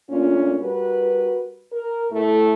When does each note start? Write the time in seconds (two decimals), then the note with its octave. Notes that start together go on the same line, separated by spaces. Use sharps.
0.10 A#2 A3 A#3 C#4 D4 F4
0.61 G3 F#4 A#4 B4
1.73 A#4
2.12 A2 A3 E4